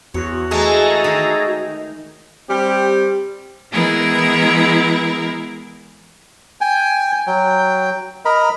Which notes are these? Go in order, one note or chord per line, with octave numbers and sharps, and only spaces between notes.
E2 F#4 C#5
E3 G#3 A3 G#4 A4 A#5
D#3
G3 C4 G4
E3 G#3 B3 E4 G#4 A#4
G5 G#5
F#3 G5
A#4 D#5 A#5 B5